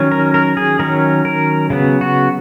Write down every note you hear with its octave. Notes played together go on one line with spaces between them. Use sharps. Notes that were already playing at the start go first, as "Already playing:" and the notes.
Already playing: D#3 F#3 C#4
A#4
A#4
G#4
D#3 F#3 C#4 A#4
A#4
C#3 F#3 B3
F#4